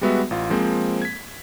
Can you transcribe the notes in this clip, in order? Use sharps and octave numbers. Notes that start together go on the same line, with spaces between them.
G3 G#3 B3 F#4 E5
A1 F4
F3 G#3 A#3 C4
G#6 B6